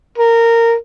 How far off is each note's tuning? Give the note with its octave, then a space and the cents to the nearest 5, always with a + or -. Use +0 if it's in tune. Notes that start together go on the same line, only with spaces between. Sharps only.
A#4 -15